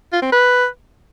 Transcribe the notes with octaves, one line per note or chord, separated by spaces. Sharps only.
F4
C4
B4